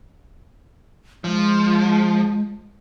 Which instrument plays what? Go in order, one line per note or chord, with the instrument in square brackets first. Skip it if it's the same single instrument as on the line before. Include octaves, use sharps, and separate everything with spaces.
[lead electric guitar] F3 [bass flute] G#3